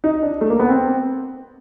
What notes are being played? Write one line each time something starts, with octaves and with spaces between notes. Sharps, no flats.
D#4
D4
A3
A#3
B3
C4